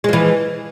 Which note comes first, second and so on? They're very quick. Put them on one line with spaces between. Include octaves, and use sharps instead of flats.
G#3 F3 E3